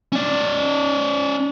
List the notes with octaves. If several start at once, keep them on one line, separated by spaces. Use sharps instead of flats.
C#4 D5